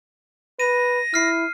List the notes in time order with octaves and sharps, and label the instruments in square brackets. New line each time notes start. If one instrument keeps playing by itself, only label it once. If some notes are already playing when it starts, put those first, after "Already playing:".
[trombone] B4 [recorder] A#6 [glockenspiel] D#7
[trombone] E4 [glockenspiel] F6 C7